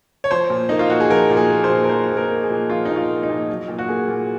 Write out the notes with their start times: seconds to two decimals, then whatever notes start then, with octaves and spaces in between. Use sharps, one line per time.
0.24 C#5
0.31 F3 C5
0.50 A#2
0.69 A#3 D#4
0.79 F4
0.90 A#2 F#4
1.00 G#4
1.10 F3 A#4
1.30 A#2
1.37 G#4
1.51 A#3
1.64 C5
1.69 A#2
1.84 A#4
1.89 F3 C5
2.10 A#2
2.17 A#4
2.30 A#3
2.43 G#4
2.50 A#2
2.70 F3 F4
2.85 A#2 D#4
2.96 F4
3.09 A#3
3.23 D#4
3.29 A#2
3.50 F#3
3.68 A#2
3.78 F#4
3.89 A#3 G#4
4.08 A#2